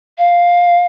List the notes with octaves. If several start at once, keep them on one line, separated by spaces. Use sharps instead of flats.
F5